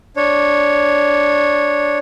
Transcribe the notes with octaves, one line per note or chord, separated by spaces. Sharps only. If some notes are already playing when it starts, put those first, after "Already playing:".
D4 C#5